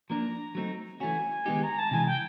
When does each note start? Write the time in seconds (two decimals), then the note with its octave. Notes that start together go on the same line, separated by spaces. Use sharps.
0.09 F3 A#3 D4 A#5
0.55 F#3 A3 C4 D#4
1.00 E3 A3 C#4 F#4 G#5
1.46 D#3 G#3 B3 D#4 G4
1.63 A#5
1.78 A5
1.91 C3 E3 G#3 G#5
2.06 G5